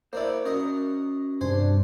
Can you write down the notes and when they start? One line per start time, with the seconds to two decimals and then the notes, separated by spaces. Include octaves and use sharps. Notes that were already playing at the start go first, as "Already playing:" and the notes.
0.13 A#3 D4 E4 C5 D5
0.45 C#4 F#4 A#4 D#5
1.41 G2 C3 D4 C5 G#5